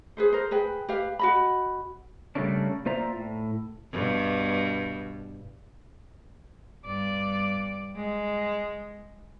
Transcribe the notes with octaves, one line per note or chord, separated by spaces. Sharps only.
G#4 B4 C5
A#4 C5
G#4 B4 G5
G4 B4 F5
F#4 D#5 B5
C#3 G3 A3 A#3 C#4 D4
A#3 F4 C5 D5 E5 A#5
A2
G2 B2
G2 D5
G#3